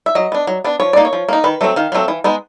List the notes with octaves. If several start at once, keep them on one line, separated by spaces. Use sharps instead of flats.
E5
F#3 D#5
B3 D4
F#3
B3 D4
F3 C#5
A#3 D#4 D5
C#5
F3
A#3 D#4
D#3 B4
F#3 A3 C4
D#3 F5
F#3 A3 C4
E3
G#3 B3 D#4